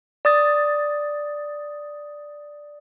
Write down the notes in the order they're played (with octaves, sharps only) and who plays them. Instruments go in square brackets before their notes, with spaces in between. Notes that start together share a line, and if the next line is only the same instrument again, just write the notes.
[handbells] D5 D#6 A6